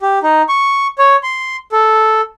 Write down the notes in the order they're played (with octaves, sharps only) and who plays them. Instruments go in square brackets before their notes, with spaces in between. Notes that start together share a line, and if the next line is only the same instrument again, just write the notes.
[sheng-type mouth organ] G4
D#4
C#6
C#5
C6
A4